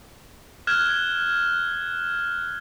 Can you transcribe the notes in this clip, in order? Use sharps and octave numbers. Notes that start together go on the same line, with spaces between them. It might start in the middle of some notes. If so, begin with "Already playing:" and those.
F6 F#6 G#6 E7